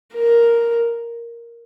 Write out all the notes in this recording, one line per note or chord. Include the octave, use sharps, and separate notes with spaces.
A#4